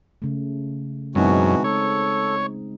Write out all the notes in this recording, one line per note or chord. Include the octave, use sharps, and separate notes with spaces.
C#3 A3
F#2 B2 E3 G#3 C4 D#4 F#4
A4 C#5